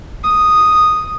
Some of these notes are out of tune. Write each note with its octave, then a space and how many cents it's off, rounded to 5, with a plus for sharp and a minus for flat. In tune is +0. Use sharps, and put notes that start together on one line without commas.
D#6 -5